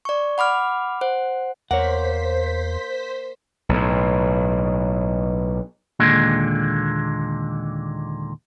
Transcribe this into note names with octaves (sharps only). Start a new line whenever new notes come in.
D5 C#6
F#5 B5 D6 F6
C5 F#5
E2 A#3 C5 C#5 F#5 B6
B1 A2
D#2 A#2 D3 G#3